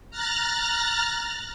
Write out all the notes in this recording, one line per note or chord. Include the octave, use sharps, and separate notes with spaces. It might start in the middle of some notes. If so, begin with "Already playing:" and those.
A#5 F6 F#6 A6 A#6